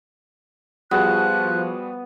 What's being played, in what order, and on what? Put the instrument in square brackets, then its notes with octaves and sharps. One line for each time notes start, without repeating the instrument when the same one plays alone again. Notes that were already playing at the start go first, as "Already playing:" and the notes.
[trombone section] F3 [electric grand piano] G3 F#4 G#4 [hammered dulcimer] B3 [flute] F#6